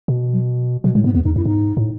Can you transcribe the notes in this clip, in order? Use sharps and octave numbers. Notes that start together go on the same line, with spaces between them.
B2
F#3
B2 F#3
A2 G#3
G#2 B3
E2 B3
E2 D#4
F#2 E4
G#2 D#4
A2